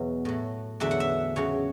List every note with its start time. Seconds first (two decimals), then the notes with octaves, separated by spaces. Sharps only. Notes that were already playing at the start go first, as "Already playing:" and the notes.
Already playing: E2 B2 F#3
0.25 A2 F#3
0.80 E2 D3 F#3 E5
0.91 F#5
1.00 E5
1.36 E2 C#3 F#3 C#5